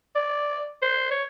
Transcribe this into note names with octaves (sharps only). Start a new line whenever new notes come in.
D5
C5
C#5